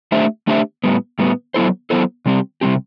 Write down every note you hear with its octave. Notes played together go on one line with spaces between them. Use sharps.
A3 D4 G4 C5 E5
A3 D4 G4 C5 E5
A2 G3 B3
A2 G3 B3
F#3 B3 E4 A4 C5
F#3 B3 E4 A4 C5
C3 G3 C4 G4
C3 G3 C4 G4